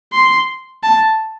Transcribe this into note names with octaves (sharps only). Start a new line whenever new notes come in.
C6
A5